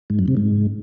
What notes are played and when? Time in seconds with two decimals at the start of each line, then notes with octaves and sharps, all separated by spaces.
0.10 G#2
0.19 F#2
0.28 C3
0.37 G#2